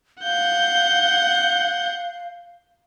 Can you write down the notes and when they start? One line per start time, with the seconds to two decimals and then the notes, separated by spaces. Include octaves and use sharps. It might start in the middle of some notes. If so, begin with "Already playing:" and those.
0.23 F5 F#5 G6